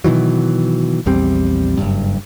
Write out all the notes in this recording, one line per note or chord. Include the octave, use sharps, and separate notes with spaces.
B2 D#3 E3 F#3
A#1 E2 G3 C4
F#1 G2